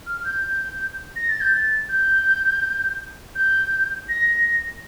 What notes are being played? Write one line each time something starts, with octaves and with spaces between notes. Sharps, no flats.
F6
F6
G6
A#6
A6
G6
A6
G6
G6
A#6